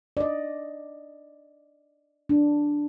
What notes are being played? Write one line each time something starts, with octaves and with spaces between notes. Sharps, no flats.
D5 D#5
D4